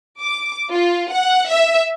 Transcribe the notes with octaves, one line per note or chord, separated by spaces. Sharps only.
D6
F4
F#5
E5